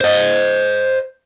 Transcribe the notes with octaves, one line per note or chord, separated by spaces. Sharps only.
C5 D#5